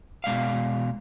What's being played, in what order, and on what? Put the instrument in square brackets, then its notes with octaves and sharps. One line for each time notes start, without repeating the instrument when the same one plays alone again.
[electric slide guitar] B2 G#3 D5 F5